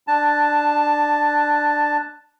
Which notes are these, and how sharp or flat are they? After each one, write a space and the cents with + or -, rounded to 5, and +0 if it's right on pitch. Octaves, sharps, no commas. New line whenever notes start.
D4 +15 A5 +0